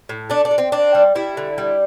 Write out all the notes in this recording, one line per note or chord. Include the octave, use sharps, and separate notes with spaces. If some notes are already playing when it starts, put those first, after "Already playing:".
A2
A3 D4
D4
A3
C4
C4 D4
G3
G3 E4
D3
G3